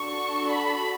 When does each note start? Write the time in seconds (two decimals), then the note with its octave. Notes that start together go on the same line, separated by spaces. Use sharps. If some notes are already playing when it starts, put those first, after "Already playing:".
Already playing: D4 F#4 A4 C#6
0.50 B5